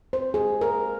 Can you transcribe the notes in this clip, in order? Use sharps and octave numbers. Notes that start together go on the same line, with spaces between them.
C5
G#4
A#4